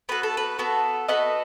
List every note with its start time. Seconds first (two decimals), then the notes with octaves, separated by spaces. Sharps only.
0.09 B3 F#4 A4 B4
0.23 A4
0.37 B4
0.59 B3 F#4 A4
1.08 B3 F#4 A4 B4 D#5